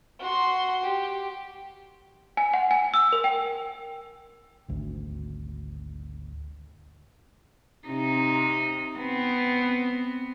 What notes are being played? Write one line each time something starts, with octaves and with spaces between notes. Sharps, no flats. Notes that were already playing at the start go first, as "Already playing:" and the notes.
F#4 C6
G4
G#5
F#5
G#5
E6
A#4
G5
G#1 D2
C3 D#4
B3 C4